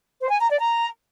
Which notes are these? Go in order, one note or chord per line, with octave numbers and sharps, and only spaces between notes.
C5
G#5
A#5
D5
A#5